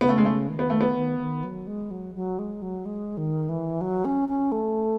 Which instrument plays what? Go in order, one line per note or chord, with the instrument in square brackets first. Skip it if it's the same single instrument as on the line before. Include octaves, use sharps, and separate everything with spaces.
[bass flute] C#3 [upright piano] B3
[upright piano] A3
G#3
A3
[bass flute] D#3
[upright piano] B3
A3
B3
[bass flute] D#3
D#3
F#3
G#3
F#3
F#3
G#3
F#3
G#3
D#3
E3
F#3
C#4
C#4
A3